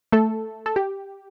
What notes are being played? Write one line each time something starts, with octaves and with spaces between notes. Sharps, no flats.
A3 A4
A4
G4